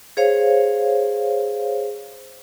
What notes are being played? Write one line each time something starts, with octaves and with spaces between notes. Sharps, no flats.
G#4 C5 C#5 F5